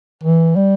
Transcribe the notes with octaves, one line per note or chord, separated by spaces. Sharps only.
E3
G3